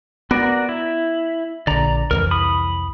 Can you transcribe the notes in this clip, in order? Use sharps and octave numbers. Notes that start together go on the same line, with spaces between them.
B3 F#4 A#4 D5
E4
A#1 D3 D5 A#5
C2 F2 E3 A#4
B5 D#6